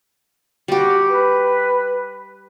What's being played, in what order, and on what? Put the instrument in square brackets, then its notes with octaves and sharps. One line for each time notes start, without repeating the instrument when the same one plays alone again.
[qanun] G3 G4 [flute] F#4
[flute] B4